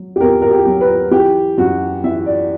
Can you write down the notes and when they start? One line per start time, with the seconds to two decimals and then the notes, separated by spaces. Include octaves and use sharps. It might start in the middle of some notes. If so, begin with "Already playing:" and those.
Already playing: F#3
0.16 G4
0.21 E2 A#4
0.42 A#4
0.51 G4
0.66 F#3
0.81 B4
1.11 E3 G4
1.58 F#2 F#4
2.04 E3 E5
2.26 D5